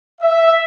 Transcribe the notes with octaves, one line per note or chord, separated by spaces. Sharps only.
E5